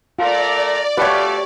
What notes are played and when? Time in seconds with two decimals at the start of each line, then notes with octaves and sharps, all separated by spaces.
0.19 A3 F4 A#4 D5 A#5
0.97 A3 F4 G4 B4 C#5 F#5